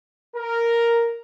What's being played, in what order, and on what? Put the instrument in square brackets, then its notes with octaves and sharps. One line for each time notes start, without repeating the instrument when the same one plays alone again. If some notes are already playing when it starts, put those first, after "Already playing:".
[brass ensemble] A#4